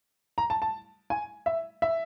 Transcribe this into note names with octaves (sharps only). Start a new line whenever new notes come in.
A#5
A5
A5
G#5
E5
E5